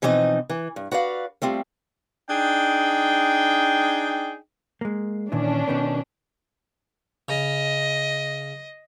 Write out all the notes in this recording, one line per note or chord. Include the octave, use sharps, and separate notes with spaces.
B2 E3 F3 C4 D#4 D#5
E3
G2
F#4 B4 D5 F5
G3 A3 C4 F4
D4 D#4 G#4 G5
G#3 A#3
A#2 D#3 E3 C#4 D4
B2 D#3 B3
C#3 D#5